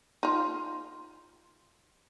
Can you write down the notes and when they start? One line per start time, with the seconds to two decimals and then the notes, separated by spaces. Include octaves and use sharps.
0.23 D#4 F4